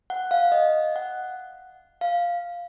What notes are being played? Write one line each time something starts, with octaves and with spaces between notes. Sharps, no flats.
F#5
F5
D#5
F#5
F5